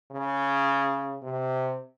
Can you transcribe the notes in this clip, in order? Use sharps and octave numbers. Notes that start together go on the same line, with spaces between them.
C#3
C3